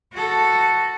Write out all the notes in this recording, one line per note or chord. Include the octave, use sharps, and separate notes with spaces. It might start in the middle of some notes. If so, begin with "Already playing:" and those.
F#4 A4